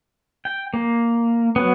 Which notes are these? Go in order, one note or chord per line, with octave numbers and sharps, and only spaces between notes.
G5
A#3
F#3 B3